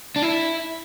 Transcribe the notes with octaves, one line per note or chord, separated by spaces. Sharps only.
D4
E4